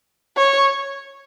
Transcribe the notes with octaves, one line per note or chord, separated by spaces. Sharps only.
C#5